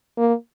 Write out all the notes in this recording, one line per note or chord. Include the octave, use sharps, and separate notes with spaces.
A#3